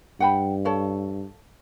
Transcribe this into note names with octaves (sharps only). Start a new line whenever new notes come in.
G2 F#5 G5 B5
A4 C#5 F5